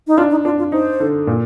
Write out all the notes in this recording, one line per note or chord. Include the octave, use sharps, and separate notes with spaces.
D#4
D4 F4
D#4
D4 F4
F4
D#4 C5
D3
A#2